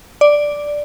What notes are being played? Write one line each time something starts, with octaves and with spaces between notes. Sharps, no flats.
D5